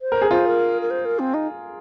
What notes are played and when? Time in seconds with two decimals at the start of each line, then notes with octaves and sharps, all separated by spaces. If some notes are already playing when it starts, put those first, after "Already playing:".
0.02 C5
0.12 A#4
0.22 G#4
0.31 F4 C5
0.46 A#4
0.82 A#4
0.91 C5
1.05 A#4
1.19 C4
1.34 D#4